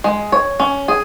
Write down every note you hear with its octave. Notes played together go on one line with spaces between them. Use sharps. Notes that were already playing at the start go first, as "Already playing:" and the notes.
G#3
C#5
C#4
G#4